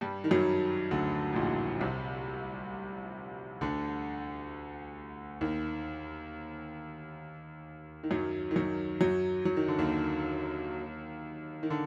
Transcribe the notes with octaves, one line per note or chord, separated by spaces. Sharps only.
G2 G3
D#3
F#2 F#3
D2 D3
A2
A#1 A#2
C2 C3
D2 D3
D#2 D#3
D#3
F#2 F#3
D#3
F#2 F#3
F#2 F#3
F#3
D#3
D3
D#2 D#3
D#3
D3